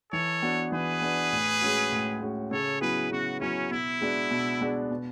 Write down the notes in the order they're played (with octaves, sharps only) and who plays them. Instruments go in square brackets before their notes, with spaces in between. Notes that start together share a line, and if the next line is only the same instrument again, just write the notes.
[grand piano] E3 [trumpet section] A4 C#5
[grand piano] B3 D4 F#4
[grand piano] E3 [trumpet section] G#4 B4
[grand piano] B3 D4 F#4
A2
G#3 C#4 F#4
A2
G#3 C#4 F#4
[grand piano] C#3 [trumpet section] A4 C#5
[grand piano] F#3 B3 E4 [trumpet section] G#4 B4
[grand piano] C#3 [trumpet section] F#4
[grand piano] F#3 B3 E4 [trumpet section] C#4
[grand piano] B2 [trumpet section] E4
[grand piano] G#3 B3 D4 F#4
B2
G#3 B3 D4 F#4
B2